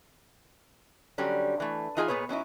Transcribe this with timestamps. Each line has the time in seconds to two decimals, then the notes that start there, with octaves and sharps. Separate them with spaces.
1.18 D3 F#3 G3 C#4
1.60 E3 A3
1.97 E3 D#4 F4 G#4 C#5 G#5
2.08 A#2 B3 G#4 B4 C#5
2.29 F#3 C#4 D#4 E4